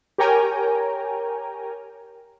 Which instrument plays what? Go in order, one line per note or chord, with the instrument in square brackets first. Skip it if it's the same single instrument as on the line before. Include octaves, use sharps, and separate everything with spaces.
[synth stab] G4 A#4 C#5 G5 G#5 A#5